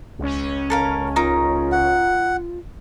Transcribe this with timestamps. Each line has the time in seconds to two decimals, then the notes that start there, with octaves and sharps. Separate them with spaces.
0.19 C#2 C#4
0.70 A4 A#4 F5
1.16 D#4 F4 A#4 A#5
1.72 F#5